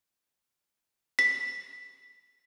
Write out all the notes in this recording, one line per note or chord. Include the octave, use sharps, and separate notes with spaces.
B6